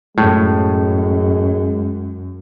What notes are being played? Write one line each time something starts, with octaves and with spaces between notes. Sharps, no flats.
F#2 A2 G#3